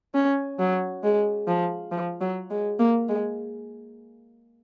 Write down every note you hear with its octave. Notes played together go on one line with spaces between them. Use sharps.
C#4
F#3
G#3
F3
F3
F#3
G#3
A#3
G#3